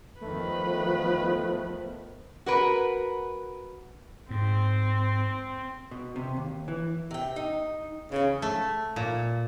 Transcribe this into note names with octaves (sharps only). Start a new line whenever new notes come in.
E2 D#3 F3 A3 B3 B4
F#4 A#4 B4
G#2 C4
B2
C3
D#2
E3
C3 G5
D#4
C#3 E3 G#4
A3
A#2